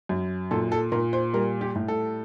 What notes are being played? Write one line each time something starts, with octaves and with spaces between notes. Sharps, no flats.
F#2
A#2 A4
A4
A#2 A#4
C5
G3 A#4
G4
A2
A4